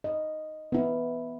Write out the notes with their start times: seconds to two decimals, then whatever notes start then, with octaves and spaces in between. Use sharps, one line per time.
0.04 D#5
0.72 B3 E4